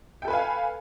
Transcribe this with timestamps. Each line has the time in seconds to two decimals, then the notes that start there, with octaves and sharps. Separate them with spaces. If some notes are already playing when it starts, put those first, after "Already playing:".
0.22 G5
0.25 A4
0.28 B4
0.30 G#5
0.33 F5